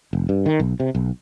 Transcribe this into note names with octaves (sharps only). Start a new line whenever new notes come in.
F1
G2
D#3
B1
C3
B1